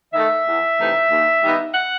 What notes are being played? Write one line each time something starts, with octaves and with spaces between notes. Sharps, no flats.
D#3 A3 E5
E2
C3 E3 A3 D#4
D#2
D#3 G3 B3 D#4
F#5